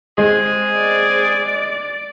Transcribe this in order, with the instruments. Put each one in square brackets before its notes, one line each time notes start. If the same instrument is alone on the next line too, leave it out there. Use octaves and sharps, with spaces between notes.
[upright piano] G#3 [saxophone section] C4 G#4
[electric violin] D5